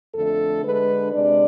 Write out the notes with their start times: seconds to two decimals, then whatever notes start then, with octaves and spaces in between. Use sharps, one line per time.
0.14 F2 D3 A3 A4
0.64 D3 G#3 D4 B4
1.13 C3 G#3 D4 D5